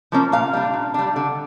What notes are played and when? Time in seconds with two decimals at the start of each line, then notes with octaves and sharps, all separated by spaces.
0.12 F3 A#3 C#4
0.32 A#2 F5
0.53 G3 D4
0.73 A#2
0.94 G3 D4
1.16 D3